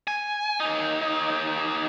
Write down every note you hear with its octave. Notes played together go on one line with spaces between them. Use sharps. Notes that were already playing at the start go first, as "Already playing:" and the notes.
G#5
D#2 D#4